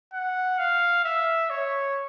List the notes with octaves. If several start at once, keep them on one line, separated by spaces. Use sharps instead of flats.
F#5
F5
E5
C#5